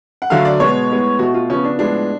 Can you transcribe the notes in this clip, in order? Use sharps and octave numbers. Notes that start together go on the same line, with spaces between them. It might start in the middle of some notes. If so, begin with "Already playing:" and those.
F#5
D3 F#3 A3 F5
D5
B2 G#3 B3 C#5
A2 G#3 B3
B2 A3 F#4
F4
C#3 F3 B3 C#4
D4
A2 F3 G#3 B3 D4